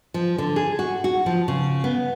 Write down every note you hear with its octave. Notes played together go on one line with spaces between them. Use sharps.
F3
D3
G#4
F#4
F#4
F3
C#3
B3